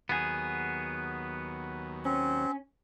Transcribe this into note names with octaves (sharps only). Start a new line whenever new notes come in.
D#2 F#3 B3 G#4
C4 C#4